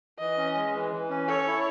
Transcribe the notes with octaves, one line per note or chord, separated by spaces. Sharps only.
E3 D#5
C#4
G#3
E3
E3
C#4
A4 C#5
E4